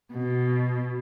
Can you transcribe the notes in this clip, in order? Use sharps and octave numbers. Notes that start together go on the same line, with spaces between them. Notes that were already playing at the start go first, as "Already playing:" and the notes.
B2